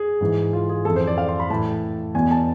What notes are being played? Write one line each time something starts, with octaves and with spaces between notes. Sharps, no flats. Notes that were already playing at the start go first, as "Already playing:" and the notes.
Already playing: G#4
G#2 E3
F4
G#4
F2 E3 A4
C5
D5
F5
C6
B5
A2 E3 A5
E2 B2 G#5
A5